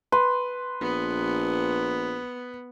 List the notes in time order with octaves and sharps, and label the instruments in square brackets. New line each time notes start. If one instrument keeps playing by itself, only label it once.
[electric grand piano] B4 [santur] C6
[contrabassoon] A#1 [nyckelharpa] B3